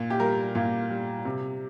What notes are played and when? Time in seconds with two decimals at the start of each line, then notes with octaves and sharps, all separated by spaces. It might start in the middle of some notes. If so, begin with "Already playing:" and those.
Already playing: A#2
0.10 G4
0.20 G3 A#4
0.55 A#2 F4
0.90 G3
1.25 C3